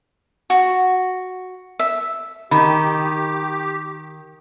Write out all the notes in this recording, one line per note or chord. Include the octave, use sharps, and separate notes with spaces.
F#4
E5
D#3 G4 B5